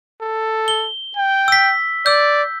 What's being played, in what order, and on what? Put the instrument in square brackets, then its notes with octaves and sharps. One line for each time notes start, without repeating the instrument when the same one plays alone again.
[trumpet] A4
[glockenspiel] G7
[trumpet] G5
[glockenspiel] E6 B6
[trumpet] D5 [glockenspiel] E6 G6